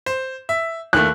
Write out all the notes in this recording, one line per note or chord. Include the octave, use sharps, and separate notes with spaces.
C5
E5
D#2 D#3 A3 F#6